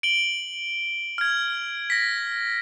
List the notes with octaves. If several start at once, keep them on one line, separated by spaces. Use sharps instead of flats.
D7 F#7 G7
F6 G#6
A#6 B6